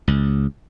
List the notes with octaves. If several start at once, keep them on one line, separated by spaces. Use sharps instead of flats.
C#2